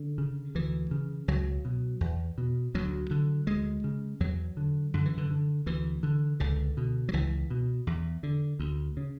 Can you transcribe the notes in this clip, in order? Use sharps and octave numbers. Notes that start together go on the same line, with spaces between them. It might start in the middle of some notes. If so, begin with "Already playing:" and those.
Already playing: D3
C#3
D2 E3
C#3
C#2 F#3
B2
E2
B2
D2 F#3
D3
D2 G#3
C#3
E2 F#3
D3
F#2 D3
E3
D3
D3
D2 E3
D3
C#2 D3
B2
F#3
C#2 E3
B2
E2
D3
D2
C#3